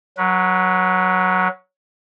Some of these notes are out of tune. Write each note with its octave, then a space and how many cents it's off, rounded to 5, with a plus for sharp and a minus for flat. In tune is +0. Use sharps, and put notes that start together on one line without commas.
F#3 +0 B4 -35